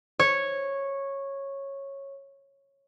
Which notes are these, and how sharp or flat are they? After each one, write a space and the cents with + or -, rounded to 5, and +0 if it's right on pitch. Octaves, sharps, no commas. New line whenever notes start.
C#5 -10